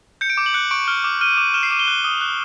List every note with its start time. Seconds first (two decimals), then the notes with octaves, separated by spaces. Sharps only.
0.21 G6 C#7
0.30 D7
0.37 D6
0.46 F#7
0.54 F#6 C#7
0.71 C#6 D7
0.88 F6
1.04 D6
1.21 F6 D#7
1.38 D6
1.54 F6 E7
1.63 C7
1.71 D6 D#7
1.79 G7
1.88 F#6
2.04 D#6
2.21 F#6